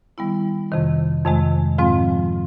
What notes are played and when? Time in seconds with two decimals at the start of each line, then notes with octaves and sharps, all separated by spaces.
0.18 D#3 G3 B3 E4
0.72 F2 C3 D#3
1.25 F2 C3 D#3 G#3
1.78 G#2 F3 G#3 C4 F4